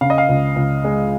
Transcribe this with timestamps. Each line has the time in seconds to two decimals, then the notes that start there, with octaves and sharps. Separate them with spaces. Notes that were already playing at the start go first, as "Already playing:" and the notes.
0.01 C#3 F5
0.10 D#5
0.18 F5
0.29 C#2
0.56 C#2
0.84 G#3